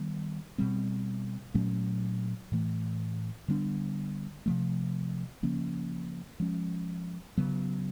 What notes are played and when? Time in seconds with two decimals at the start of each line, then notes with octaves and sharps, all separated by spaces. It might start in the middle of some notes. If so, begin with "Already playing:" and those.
Already playing: D#3 G3 B3
0.58 B2 G3 C4
1.54 A#2 F#3 A3 C#4
2.52 A2 E3 A3
3.48 D3 G3 B3 D4
4.46 C3 F3 A3
5.43 C#3 F3 A#3 C#4
6.40 F3 G#3 C#4
7.37 C#3 F#3 B3